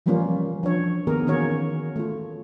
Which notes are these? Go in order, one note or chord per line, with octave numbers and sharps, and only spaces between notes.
E3 F3 G3 A#3 C#4 F4
F3 D4 C#5
D#3 A#3 B3 G4 G#4 A#4
D#3 E3 A#3 C#4 F#4 C#5
A3 F4